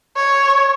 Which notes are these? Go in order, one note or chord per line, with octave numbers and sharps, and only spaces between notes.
C#5